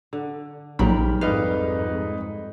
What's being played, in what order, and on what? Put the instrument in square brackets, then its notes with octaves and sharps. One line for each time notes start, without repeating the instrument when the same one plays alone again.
[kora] D3
[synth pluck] A#1 F#3 B5 [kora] G#2 G3 A#4
[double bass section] F2 G#2 [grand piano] D#4 B4 D5 [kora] F5 [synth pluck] F6